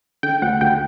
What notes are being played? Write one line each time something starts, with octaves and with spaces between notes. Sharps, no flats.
D3 G5
D2 F#5
D2 G5